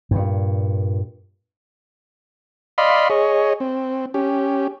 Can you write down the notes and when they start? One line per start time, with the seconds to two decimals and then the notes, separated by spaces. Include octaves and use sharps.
0.11 G2 A#2
2.78 D5 D#5 F5 B5 C6
3.10 G#4 C#5 D#5
3.60 C4
4.14 C#4 G4